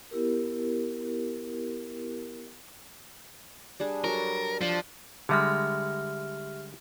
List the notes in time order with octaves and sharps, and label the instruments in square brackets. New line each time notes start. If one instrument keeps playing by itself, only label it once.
[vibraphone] B3 E4 G4 A#4
[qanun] G3 D4 G#4
[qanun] F#3 G3 A4 [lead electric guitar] A#4
[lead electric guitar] F3 [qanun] D4
[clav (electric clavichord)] D3 G3 G#3 [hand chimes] G4 E5 F6